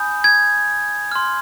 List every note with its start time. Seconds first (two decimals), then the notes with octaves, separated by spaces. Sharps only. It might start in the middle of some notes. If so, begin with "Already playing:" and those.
Already playing: G#5 B5 D#6 G6
0.24 G#6
1.12 C6 F6